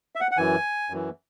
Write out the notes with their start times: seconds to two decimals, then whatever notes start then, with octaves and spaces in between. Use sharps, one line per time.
0.16 E5
0.21 F#5
0.31 F#5
0.37 F#2 E3 G#5
0.90 F#2 E3